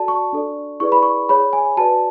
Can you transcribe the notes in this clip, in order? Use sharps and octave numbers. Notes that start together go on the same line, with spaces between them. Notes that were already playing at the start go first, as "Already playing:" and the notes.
Already playing: F#4 A4 D5 A5
C#6
D4 A4 D5
E4 G#4 B4 D5 C#6
B5
C#6
G#4 C#5 B5
G#5
F#4 B4 D5 A5